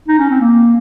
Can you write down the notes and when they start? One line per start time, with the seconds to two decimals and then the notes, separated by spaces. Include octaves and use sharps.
0.08 D#4
0.18 C#4
0.30 C4
0.40 A#3